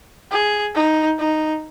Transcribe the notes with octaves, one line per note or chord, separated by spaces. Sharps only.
G#4
D#4
D#4